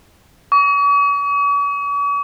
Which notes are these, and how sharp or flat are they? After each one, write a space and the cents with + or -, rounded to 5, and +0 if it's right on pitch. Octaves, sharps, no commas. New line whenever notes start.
C#6 +45